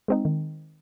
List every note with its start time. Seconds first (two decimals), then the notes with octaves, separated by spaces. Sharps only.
0.08 G#3 C4 D#4
0.25 D#3